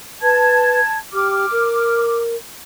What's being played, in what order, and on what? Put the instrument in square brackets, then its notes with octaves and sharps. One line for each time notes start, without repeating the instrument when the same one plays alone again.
[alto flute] B4 [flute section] A5 G#6
[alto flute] G4 [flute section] D6 F6
[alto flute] A#4